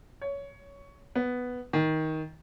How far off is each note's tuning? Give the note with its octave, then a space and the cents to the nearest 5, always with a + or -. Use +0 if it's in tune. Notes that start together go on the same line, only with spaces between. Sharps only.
C#5 +15
B3 +5
D#3 +15